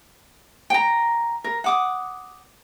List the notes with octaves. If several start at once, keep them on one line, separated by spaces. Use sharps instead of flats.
G5 A#5
A#4
F#5 D6 D#6